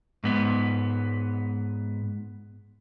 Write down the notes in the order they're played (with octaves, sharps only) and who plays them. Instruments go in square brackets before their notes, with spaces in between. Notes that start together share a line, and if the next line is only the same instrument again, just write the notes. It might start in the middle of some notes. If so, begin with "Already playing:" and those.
[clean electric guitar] G#2 B3